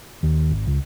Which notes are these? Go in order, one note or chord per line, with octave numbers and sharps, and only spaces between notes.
D#2
G#1
C#2